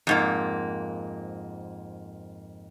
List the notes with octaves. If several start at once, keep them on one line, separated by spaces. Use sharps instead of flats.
F2 G#2 A#3